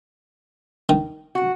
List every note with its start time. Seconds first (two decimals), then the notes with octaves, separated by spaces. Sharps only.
0.89 D#3
1.35 F#4